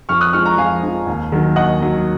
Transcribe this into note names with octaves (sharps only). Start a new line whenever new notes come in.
F2 C#6 F6
D#6 F#6
F3 G#3 C#6 F6
A#5 C#6
F2 F5 G#5
F3 G#3
D#2
D#3 F#3
D#2 D#5 F#5
D#3 F#3